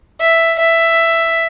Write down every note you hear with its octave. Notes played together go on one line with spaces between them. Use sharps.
E5
E5